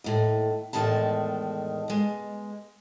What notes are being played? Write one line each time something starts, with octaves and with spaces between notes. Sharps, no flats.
D#2 A2
E2 A2 D#3 G#3 A5
B2 G#3